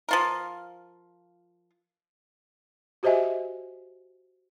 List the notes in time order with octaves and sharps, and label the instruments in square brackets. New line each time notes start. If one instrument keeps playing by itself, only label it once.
[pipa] F3 F4 A#4
[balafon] F#4 G4 C5 D#5 E5 G#5